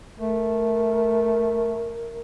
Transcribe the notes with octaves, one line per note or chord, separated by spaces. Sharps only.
A3 A#4